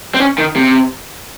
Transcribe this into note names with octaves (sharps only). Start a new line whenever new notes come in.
C4
C#4
D#3
C3